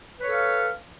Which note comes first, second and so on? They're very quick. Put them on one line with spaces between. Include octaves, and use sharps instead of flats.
B4 C#5 A4 F5